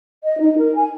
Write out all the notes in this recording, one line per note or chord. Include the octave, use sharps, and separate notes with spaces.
D#5
D#4
A#4
G#5